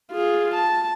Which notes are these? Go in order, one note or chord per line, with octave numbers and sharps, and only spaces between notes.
F4 G#4
A5